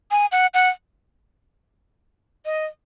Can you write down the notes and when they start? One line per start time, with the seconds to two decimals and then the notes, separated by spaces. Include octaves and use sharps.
0.11 G#5
0.32 F#5
0.54 F#5
2.45 D#5